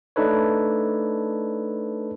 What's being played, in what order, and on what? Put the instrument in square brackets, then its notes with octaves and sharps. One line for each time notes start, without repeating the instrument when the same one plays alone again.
[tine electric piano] A3 D4 D#4 A4 B4 C#5